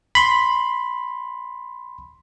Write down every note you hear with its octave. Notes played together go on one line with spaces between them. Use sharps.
B5 C6